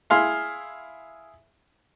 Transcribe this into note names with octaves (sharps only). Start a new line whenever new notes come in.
E4 G#4 F5 C6